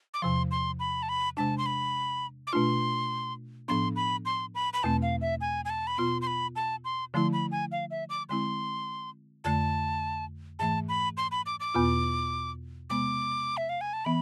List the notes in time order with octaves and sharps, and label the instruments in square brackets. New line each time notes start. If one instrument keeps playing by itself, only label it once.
[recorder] D6
[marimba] E2 C3 F3 [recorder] C6
[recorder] C6
B5
A5
B5
[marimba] C3 G#3 D4 [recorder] A5
[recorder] C6
B5
D6
[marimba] B2 A3 D4 F4 [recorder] C6
[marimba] A2 F3 B3 D4 [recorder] C6
[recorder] B5
C6
B5
B5
[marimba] E2 B2 A3 C4 [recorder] A5
[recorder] F5
E5
G#5
G#5
A5
B5
[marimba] B2 B3 F4 [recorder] C6
[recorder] C6
B5
A5
C6
[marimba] D3 F3 A3 E4 [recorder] C6
[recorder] B5
G#5
F5
E5
D6
[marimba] D3 G#3 C4 E4 [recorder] C6
[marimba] F2 D3 A3 [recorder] A5
[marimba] G#2 E3 A3 [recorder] A5
[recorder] B5
C6
B5
D6
D6
[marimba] E2 B2 B3 F4
[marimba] C3 G#3 B3 [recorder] D6
[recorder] E5
F5
G#5
A5
[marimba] E3 B3 [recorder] B5